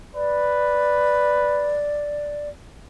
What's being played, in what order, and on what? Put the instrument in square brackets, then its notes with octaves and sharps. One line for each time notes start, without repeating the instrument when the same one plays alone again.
[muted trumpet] B4 [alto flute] D5